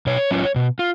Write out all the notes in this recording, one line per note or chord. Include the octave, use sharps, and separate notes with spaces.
B2 C#5
F#3 C#4 F4
B2
F4